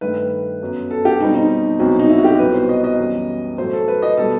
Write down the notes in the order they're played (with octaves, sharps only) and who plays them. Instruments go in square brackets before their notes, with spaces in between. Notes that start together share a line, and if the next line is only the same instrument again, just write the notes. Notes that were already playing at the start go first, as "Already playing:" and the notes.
[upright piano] G2 D#3 A3 B4
B4
F#2 F#3 B3
A4
G4
B2 G3 C4 D#4
D#4
C2 B2 F#3 C4
D#4
E4
F#4
G4
C2 B2 F#3 B3 B4
C5
D#5
D#5
F#2 E3 G3 B3
A2 F#3 A3 C5
A4
B4
D#5
B2 G3 B3 A4